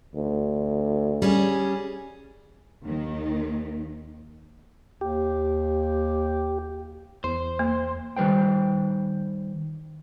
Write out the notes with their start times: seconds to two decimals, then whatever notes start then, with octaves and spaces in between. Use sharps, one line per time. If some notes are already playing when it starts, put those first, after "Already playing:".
0.15 D2
1.22 G3 C#4 G#4
2.83 D#2 D#3
5.01 D#2 G4
7.24 E2 C5
7.59 A#3
8.17 D#3 G3 B4 C5 G5